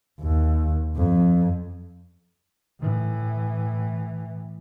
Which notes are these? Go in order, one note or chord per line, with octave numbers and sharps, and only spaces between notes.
D#2
F2
A2 E3